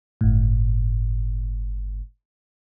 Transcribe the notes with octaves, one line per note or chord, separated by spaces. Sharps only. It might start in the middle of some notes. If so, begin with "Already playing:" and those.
G1 A2